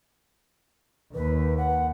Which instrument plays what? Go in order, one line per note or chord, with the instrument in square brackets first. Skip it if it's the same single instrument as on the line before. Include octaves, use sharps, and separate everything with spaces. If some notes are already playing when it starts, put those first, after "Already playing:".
[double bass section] D#2 [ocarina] B4
[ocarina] F#5